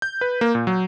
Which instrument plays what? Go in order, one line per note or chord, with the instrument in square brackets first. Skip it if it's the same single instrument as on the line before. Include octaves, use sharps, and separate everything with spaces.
[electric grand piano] G6
B4
A#3
A#2
F#3